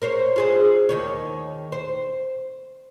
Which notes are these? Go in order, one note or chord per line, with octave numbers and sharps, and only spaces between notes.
A#4 C5 C#5
F4 G#4 C5
D#2 D#3 C#5
C5